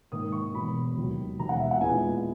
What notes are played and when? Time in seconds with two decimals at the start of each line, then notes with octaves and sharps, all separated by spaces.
0.11 G#2 D#3 A#3 D#4 D#6
0.32 C#6
0.53 E1 E2 B2 B5
0.97 D#2 D#3 F#3
1.39 E1 D#2 D#3 A#5
1.49 F#5
1.60 E5
1.71 F#5
1.81 A#2 G#3 B3 E4 G#5